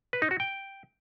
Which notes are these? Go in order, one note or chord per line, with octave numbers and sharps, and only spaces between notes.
B4
D#4
F#4
G5